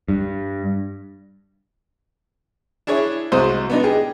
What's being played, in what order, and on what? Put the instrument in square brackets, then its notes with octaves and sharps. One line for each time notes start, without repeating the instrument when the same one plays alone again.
[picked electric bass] G2
[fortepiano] D4 E4 G#4 C#5
C2 F#3 G#3 C5 D#6
B3 D4 D#4
G4 G#4